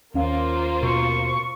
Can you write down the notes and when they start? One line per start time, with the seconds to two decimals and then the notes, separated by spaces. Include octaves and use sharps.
0.14 D#2 A#3 C#4 F4 C5 F5
0.83 B2 C#6